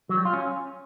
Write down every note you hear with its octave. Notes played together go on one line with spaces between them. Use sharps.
F#3
G3
F4
C#4